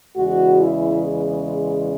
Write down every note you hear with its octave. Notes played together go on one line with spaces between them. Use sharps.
E2 C#3 G#3 F#4
E4